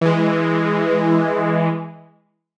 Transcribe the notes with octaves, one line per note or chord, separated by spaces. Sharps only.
E3 G#3